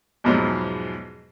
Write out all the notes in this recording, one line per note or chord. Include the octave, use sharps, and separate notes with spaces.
E2 G#2 B2 F3 F#3